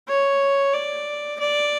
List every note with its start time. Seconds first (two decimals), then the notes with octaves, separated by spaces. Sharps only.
0.08 C#5
0.74 D5
1.40 D5